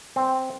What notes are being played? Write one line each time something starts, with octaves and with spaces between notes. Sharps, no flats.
C4